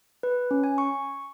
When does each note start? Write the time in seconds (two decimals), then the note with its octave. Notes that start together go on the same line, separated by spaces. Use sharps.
0.23 B4
0.51 C#4
0.64 G#5
0.78 C#6